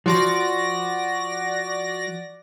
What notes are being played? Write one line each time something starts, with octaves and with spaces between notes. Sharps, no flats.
F3 F#4 D5 A#6